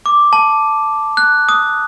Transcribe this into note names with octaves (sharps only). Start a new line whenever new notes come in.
D6
A5
F#6
D#6